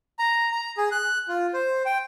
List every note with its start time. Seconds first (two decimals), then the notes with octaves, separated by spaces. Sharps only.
0.19 A#5
0.52 A#5
0.78 G#4
0.91 F#6
1.28 F4
1.53 C5
1.86 G5